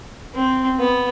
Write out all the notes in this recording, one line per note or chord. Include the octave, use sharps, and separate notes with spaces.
C4
B3